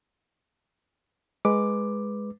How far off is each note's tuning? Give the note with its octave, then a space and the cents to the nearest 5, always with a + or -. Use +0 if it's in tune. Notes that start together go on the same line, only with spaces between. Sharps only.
G#3 +0 B4 +0 D6 +5